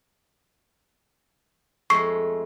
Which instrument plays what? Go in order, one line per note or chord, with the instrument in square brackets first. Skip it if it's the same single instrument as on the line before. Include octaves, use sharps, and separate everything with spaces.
[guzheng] F2 G#3 A3 [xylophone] C#6 C7